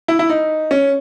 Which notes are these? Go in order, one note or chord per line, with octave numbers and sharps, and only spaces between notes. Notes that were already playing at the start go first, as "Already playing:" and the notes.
E4
E4
D#4
C#4